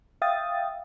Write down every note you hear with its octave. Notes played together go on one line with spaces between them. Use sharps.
E5 F5 G5 D#6 A6